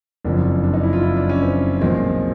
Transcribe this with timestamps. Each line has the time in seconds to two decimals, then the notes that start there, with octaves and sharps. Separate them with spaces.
0.25 F#1 F2 C#3 F3 D4
0.64 D4
0.74 D#4
0.83 E4
0.93 F4
1.03 E4
1.16 D4
1.29 C#4
1.42 C4
1.81 B1 A#2 F3 G#3 C4